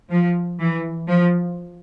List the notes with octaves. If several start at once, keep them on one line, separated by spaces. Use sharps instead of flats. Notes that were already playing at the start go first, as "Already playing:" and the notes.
F3
E3
F3